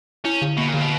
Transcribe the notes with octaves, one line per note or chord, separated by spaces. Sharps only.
C#4 E4
D3
B2 A#3
A#2 D3
B2